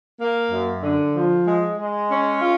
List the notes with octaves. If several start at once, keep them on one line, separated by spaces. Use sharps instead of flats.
A#3
F#2
D3
F3
G#3
G#3
C#4
F4